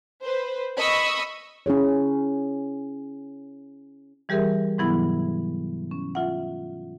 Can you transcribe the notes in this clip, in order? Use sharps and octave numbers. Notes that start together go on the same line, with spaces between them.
B4 C5
D#5 B5 C#6 D#6 E6
C#4 E4 G#4 C#5
E3 G3 G4 G#4 A#4 E5
G#2 C3 E3 F#3 B3 E4
C#4
F4 E5 F#5